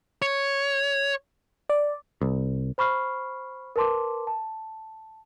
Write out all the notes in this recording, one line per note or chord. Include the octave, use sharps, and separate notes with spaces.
C#5
D5
C2
C5 B5 C#6 F6 C7
A#4 B4 A5 C6 D6
A5